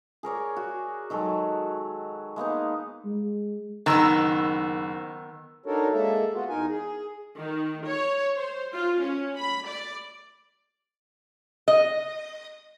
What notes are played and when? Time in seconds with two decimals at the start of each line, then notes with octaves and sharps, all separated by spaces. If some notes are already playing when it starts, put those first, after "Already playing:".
0.23 G#4 A#4 C#5 D5
0.56 F#4
1.10 D#3 F#3 G#3 A4
2.36 G#3 A#3 B3 D#4
3.05 G#3
3.86 F#1 D#3 B3 E6
5.66 D4 D#4 F#4 A4 A#4 C#5
5.93 G#3 A#3 A4 E5
6.34 B3 F4 F#4
6.49 E2 D#4 A#4 G#5
6.68 G#4
7.38 D#3
7.86 C#5
8.37 C5
8.73 F4
9.01 C#4
9.37 B5
9.67 D5
11.68 D#5